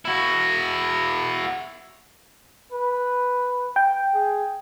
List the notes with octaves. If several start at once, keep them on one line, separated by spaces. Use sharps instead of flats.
E4 F#4
B4
G5
G#4